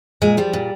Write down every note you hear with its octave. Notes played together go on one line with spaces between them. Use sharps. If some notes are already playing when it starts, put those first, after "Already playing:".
A#2 G#3
F3 G3
A#2